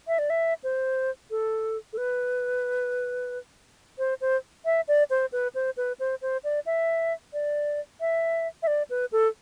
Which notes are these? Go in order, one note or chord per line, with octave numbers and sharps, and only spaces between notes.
E5
D5
E5
C5
A4
A4
B4
C5
C5
E5
D5
C5
B4
C5
B4
C5
C5
D5
E5
D5
E5
E5
D5
B4
A4